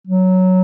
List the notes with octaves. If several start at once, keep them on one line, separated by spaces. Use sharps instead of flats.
F#3